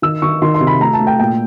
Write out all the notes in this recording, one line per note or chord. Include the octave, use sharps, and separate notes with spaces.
D#3 E6
D#3 C#6
D#3 C6
C6
C3
B5
A3 A#5
A5
A3
G5
A#2 G5